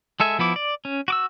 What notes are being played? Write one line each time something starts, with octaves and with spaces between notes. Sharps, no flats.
G#3 A4 E5 G#5
F3 B3 E4 D6
D5
C#4
F#4 D6 E6